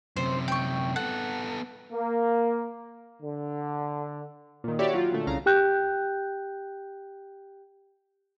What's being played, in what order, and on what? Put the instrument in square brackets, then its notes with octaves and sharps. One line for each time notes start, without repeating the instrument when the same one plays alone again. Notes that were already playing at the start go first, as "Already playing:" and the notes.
[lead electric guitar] F#2 C3 [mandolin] C5
[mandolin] G5 C#6
[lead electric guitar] B3 A4 [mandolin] F#5
[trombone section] A#3
D3
[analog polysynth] A#2 D#3
E4 F#4 G4 C#5 D5 E5
F#3 F4
A#2 D3 A3
C2 C#3 F5 A#5
[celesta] G4 G5 F#6 G6